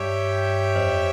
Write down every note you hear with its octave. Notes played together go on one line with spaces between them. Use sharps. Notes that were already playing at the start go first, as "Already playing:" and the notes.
Already playing: G2 G4 C#5 E5 G5
F2